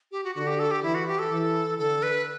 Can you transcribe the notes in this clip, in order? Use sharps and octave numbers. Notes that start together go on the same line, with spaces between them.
G4
F#4
D3 F#4
G4
A4
G4
E3 E4
F#4
G4
A4
E3
D3 A4
B4